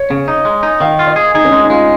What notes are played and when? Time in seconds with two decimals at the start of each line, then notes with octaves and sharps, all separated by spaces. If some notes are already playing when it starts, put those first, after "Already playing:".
Already playing: C#5
0.11 C#3
0.28 D#4
0.45 G#3
0.63 D#4
0.80 D#3 F5
0.99 F4
1.07 D#5
1.16 G#4
1.35 D#4 G#4
1.45 C#4
1.52 G#3 D#4
1.64 D#4
1.70 G#3 F4